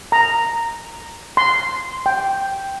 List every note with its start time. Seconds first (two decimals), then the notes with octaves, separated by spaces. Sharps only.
0.12 A#5
1.37 C6
2.06 G5